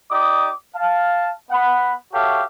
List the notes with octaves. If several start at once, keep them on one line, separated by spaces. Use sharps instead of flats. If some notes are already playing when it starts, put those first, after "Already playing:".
D#4 G4 D5 D6 D#6
F5 A5
B3 F#5 B5
F#4 G4 A4 C#5 E5 F5